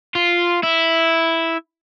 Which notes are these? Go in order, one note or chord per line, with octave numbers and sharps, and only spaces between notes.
F4
E4